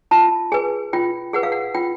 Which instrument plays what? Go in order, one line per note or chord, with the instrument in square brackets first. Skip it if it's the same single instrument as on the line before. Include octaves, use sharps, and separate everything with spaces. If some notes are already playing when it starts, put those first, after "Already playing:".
[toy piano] F4 A5
G#4 B4 G#5
F4 G5
G#4 B4 F#5
F5
F#5
F4 G5